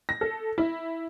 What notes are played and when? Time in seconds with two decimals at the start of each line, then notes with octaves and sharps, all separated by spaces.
0.09 A#6
0.21 A4
0.58 E4